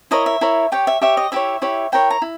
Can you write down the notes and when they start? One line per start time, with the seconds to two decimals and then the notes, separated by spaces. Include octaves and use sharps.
0.11 E4 A#4 C#5 D#5
0.26 E5
0.41 E4 A#4 C#5
0.72 G4 C#5 G5
0.87 E5
1.01 G4 C#5 E5
1.17 D#5
1.32 E4 G4 C#5 E5
1.62 E4 G4 C#5
1.92 E4 A#4 C#5 G5
2.11 A#5
2.22 E4